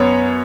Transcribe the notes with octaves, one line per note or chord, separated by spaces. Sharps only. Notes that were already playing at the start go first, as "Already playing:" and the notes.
Already playing: F#2 B3 C#5